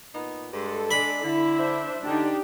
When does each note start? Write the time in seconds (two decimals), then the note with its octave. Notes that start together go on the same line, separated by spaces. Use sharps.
0.13 A#2 B3 D#4
0.52 G2 G#3 A4
0.91 G#3 D4 B5
1.22 D3 E4
1.55 D4 C5 E5
2.04 D3 D4 D#4 G4